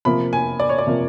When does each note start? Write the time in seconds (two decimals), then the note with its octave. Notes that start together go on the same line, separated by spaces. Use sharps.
0.05 C3 F3 A#3 B5
0.33 G#5
0.60 D5
0.69 C#5
0.78 D5
0.87 C3 F3 A#3